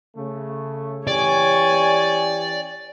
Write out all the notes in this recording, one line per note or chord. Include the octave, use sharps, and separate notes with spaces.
C#3 A3
E3 C#4 G4 C#5 D5 G#5